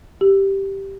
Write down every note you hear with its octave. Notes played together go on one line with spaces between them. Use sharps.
G4